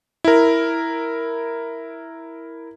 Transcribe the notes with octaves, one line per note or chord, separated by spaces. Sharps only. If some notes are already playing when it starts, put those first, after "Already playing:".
E4 A#4